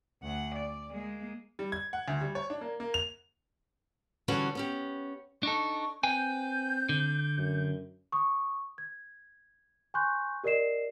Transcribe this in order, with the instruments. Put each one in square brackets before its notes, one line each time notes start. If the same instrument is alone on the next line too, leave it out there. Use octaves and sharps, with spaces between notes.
[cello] D2 F#5
D5
G#3 A#3
[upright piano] G3
G#6
F#5
D2
G3
C#5
D4
A#3
A#3
F7
[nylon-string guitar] D3 E3 G3 C#4 F#4 B4
B3 C#4 G4
[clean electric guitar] D4 D#4 A4 [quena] C#6
[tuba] C4 [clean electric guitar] B4 G5 G#5 [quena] G6
[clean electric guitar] D3
[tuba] F#2
[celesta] C#6 D#6
G#6
G#5 C6 C#6 F#6 G6
G4 A#4 D5 D#5 C7 E7